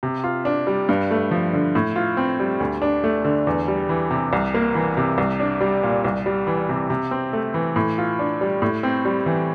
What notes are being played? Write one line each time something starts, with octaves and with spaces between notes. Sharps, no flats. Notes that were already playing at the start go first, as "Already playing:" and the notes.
C3
F4
D4
G3
G2
A3
F3
D3
A2
F4
C4
G3
D2
D4
A3
D3
E2
G3
E3
C3
C2
A#3
E3
C3
C2
D4
G3
A#2
C2
G3
E3
C3
C3
C4
A3
E3
A2
F4
D4
G3
A2
C4
G3
E3